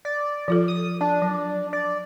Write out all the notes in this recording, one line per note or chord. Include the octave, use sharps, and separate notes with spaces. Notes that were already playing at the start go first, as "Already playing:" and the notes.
D5
F3 F4 A4
D#6
D4
F#3
D5